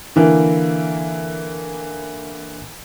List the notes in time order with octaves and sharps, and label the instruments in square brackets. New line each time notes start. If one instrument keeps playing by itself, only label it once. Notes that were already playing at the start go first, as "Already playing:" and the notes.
[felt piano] D3 E3 A#3